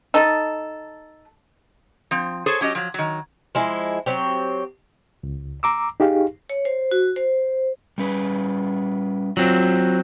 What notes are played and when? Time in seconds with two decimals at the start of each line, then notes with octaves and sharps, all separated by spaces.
0.14 D#4 A4
2.11 F3 C4
2.46 G#4 A4 C5 C#5
2.61 F#3 C#4 G4 D#5
2.75 F3 F#3
2.94 D#3 F#3
3.55 F3 G#3 E4
4.06 F#3 C4 G4
5.23 C#2
5.63 A#5 D6 E6
6.00 D#4 G4 G#4 F5
6.50 C#5
6.65 C5
6.91 F#4
7.16 C5
7.98 G3 C#4 B4
9.37 F#3 C4 F4